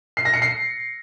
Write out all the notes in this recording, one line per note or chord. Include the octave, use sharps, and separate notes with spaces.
C7
A#6
C#7
C7